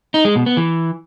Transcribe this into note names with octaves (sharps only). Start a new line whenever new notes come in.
D#4
G#3
B2
B3
E3